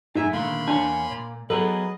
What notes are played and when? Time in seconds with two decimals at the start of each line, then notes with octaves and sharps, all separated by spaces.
0.15 F#2 A#2 D#4 G#4 E5 G#5
0.33 A#2 D3 D#3 A#3 B5 C6
0.68 E2 D4 C#5 G#5
1.11 A#2
1.50 F#3 B3 G#4 A4 B4 D#5